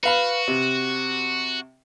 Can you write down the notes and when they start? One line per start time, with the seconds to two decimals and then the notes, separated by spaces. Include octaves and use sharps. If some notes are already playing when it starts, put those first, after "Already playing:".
0.03 F#4 B4 F5 B5
0.48 C3